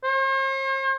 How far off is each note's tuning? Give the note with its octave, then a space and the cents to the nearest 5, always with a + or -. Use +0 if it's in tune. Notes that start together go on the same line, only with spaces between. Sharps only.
C5 +45